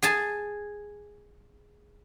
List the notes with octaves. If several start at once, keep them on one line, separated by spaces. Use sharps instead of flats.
G#4 G#5 A5